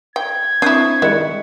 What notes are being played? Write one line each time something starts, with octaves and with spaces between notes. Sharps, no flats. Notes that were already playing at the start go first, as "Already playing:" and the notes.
G5 G#6
C4 D4 E4 C#6 D#6 G6
D#3 G3 G#3 E4 F#6 C#7